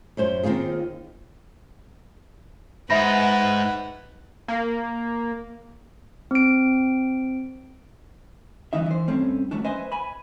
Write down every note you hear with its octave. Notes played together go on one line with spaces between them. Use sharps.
F#2 C#4 C5
D#2 D#3 C4 F4 G#4
G#2 B4 E5 F#5 B5 A#6
A#3
C4 D7
C2 B2 E3 C#4 D#4 E5
E3 C5
G2 A3 C4 C#4
F#3 A3 C#4 D4
B4 C5 D#5 E5 G#5 C6
G#5 B5